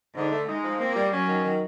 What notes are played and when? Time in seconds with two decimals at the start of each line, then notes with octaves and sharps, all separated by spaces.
0.15 G#2 D3
0.32 A3
0.47 G#3 D#4
0.64 F3
0.80 A#3 C4
0.95 G3
1.12 F#3 C#4
1.28 D#3
1.44 D#3